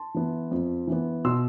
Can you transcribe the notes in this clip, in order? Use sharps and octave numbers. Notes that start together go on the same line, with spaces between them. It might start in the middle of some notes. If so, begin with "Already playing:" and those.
Already playing: A5 C6
E3 B3
F2
E3 B3
B2 C6 E6